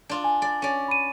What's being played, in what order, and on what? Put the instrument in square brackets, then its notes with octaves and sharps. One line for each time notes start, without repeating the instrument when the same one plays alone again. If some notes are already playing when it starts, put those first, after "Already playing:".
[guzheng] D4 F4
[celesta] G#5
[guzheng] D5
C#4 D5
[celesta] B5 D#7